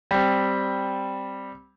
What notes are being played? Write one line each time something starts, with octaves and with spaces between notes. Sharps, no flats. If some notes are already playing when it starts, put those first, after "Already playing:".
G3 C4